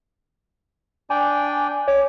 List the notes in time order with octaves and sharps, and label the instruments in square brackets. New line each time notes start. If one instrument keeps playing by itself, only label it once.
[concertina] D4 D5 G5 [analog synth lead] G#5
[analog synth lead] C#5 [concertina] D6